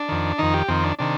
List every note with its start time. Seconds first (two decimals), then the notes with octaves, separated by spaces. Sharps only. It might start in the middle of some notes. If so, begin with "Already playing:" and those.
Already playing: D4
0.08 F2 D#3
0.38 F2 D#3 D#4
0.54 G4
0.68 F2 D#3 C4
0.84 D4
0.99 C3 D#3 D4